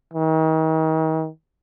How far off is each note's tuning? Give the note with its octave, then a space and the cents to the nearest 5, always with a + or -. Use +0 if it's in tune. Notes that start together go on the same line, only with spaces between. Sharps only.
D#3 +40